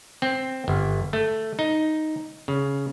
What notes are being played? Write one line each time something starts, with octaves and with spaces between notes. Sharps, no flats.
C4
G1
A3
D#4
C#3